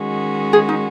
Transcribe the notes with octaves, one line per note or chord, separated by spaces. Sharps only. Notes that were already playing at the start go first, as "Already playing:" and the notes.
Already playing: D#3 G#3 C#4 F#4
G#4
D#4